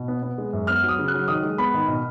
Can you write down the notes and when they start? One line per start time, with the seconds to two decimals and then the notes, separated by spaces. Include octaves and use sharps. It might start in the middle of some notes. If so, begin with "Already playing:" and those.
Already playing: B2
0.08 B3
0.23 B3
0.38 G#3
0.53 F#2
0.67 B3 F6
0.83 F#3
0.88 D#6
0.99 C#3
1.08 F#6
1.14 F#3
1.28 D#3 D#6
1.43 G#3
1.58 B3 B5
1.74 D#3
1.88 B2